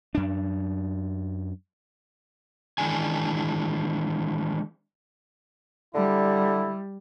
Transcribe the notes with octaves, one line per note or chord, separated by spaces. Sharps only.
F#2 D4
D#3 E3 G#3 D4 G#5
D3 G3 E4